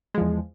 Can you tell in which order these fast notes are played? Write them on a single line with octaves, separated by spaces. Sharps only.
G#3 F3 E2